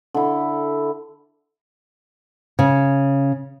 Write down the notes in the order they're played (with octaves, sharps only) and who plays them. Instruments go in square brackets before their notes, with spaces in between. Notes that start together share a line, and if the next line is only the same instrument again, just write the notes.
[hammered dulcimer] D3 E4
[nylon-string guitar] C#3